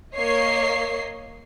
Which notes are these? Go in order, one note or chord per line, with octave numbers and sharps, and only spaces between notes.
A#3 C#5 D#5 C7